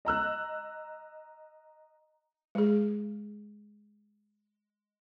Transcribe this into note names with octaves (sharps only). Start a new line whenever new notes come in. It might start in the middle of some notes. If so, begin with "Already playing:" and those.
D#5 A#5 E6 F#6
G#3 G#4